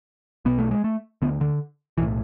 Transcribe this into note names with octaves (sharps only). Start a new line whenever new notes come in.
B1 B2 B3
A3
G#3
A3
D2 D3 B3
D3
B1 A2 E3